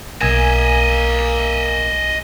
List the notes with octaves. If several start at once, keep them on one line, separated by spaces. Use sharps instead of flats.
B1 A#3 D#5 E5 G#5